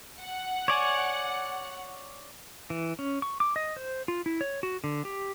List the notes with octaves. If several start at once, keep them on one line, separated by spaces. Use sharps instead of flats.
F#5
C#5 D5 G#5
E3
C#4
C#6
D6
D#5
C5
F4
E4
C#5
F#4
D3
G4